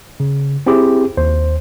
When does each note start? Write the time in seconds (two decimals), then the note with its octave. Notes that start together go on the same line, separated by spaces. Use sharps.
0.20 C#3
0.66 C4 E4 G4 G#4
1.17 D#2 C5